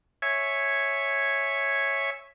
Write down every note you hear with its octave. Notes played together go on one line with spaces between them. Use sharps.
C#5 E5 G#5